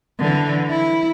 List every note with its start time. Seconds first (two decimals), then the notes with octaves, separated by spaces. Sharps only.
0.19 D3 E3
0.70 E4